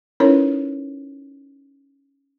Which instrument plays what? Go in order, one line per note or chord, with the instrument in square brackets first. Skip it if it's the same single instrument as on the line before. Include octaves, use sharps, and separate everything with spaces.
[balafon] C#4 D#4 E4 A#4 B4 C#5